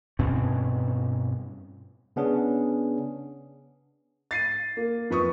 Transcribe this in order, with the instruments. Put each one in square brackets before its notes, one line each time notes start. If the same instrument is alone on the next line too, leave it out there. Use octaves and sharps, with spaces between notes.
[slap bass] G2 B2 C4 C#4
[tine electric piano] C#3 B3 C#4 D4 G#4
[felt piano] A6 C7 D#7
A#3
F2 B4 C#6 D#6